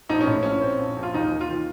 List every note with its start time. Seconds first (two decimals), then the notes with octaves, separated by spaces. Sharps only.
0.09 A#1 D#4
0.21 C#4
0.27 A2
0.43 A#1 C#4
0.61 C4
0.79 A#1
0.97 A#1
1.03 F4
1.14 D#2 D#4
1.31 D#2
1.41 F4
1.49 D#3